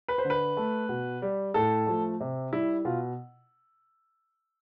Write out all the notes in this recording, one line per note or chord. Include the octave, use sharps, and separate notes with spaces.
B4
C5
D3
B4
A3
B2
G3
A2 A4
F3 A3
C3
G3 E4
B2 F4